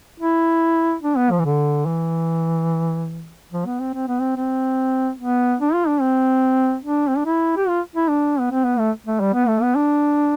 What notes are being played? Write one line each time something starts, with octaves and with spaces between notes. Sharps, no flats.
E4
D4
B3
F3
E3
D3
E3
F3
B3
C4
C4
B3
C4
C4
B3
D4
F4
D4
C4
D4
C4
D4
E4
G4
F4
E4
D4
B3
C4
B3
A3
A3
G3
B3
A3
B3
D4